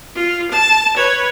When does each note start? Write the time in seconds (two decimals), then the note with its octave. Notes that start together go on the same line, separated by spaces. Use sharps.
0.15 F4
0.51 A5
0.96 B4 C#5